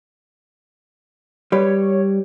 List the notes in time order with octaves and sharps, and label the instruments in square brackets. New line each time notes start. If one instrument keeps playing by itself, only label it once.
[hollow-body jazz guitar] G3 B4 [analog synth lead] C#5